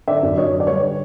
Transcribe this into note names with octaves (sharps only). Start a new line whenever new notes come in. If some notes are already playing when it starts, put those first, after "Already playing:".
D3 D5 E5
F#2
F#2 C#5 D#5
D3
D5
G3 B4 C#5
D3